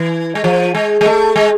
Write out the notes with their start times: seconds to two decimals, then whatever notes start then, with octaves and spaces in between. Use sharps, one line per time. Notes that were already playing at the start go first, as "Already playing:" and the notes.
Already playing: E3
0.35 G#3
0.44 F3
0.75 G#3
1.01 G#3
1.06 A3
1.36 G#3